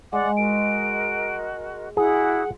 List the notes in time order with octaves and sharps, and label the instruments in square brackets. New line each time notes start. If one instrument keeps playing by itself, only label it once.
[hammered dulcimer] G#3 [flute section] D5 D6 [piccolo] F#5
[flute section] F#4 A#4 D#5 [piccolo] D7
[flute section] E4 F#4 D#6 [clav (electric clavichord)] G#4 [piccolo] F#5